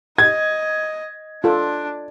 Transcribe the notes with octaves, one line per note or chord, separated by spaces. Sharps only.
D#5 G#6
D4 F4 A4